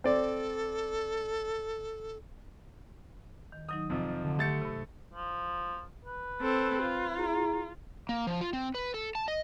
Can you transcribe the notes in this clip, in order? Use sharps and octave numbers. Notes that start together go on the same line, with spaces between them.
C4 A4 D5
D#3
D#3 F#3 D#4 D#6
F2 C3 F3
D3
A3 G4 G6 A6 C#7
G2 C3
F3
B4
C4 A4
F4
E4 G#4 A#5
A#3
F3
F4
C4
B4
A4
A5
D#5